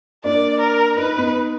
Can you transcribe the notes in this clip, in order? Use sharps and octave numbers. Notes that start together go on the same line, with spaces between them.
A#3 D4 D5
A#4
D#4 B4
B3 D#4